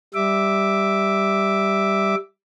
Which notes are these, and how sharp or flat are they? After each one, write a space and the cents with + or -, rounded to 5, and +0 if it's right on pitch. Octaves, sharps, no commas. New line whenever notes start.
G3 +0 E5 +0 D6 +0